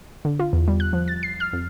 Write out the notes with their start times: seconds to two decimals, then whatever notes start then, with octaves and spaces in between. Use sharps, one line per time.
0.25 D3
0.39 F4
0.53 E2
0.68 G3
0.80 F#6
0.93 F3
1.08 A6
1.23 C7
1.40 F6
1.53 F2